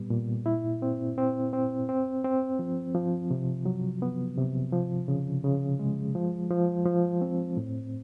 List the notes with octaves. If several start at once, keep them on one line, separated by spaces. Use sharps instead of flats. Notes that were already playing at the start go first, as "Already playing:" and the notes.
Already playing: A#2 G3 B3
A#2
E4
C4
C4
C4
C4
C4
F3
F3
C3
F#3
B3
C3
F3
C#3
C#3
G#3
F3
F3
F3
C4
A2